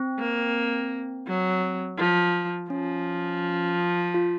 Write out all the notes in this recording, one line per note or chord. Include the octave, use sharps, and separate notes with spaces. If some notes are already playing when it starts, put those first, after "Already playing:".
Already playing: C4
A#3
F#3
F3
F3 C#4
F4